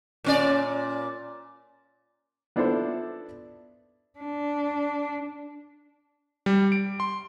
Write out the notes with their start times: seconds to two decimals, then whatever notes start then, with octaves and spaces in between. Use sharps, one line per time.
0.24 A#2 C#4 D5
2.56 B3 D4 E4 F4 A4 C5
4.19 D4
6.46 G3
6.72 D7
7.00 C6